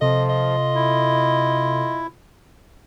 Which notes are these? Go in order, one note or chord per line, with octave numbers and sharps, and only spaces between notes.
C3 F3 F4 A4 D#5
D#5
E4